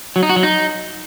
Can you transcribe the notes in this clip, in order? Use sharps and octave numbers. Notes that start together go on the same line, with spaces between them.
F#3
D#4
F#4
F#3
D#4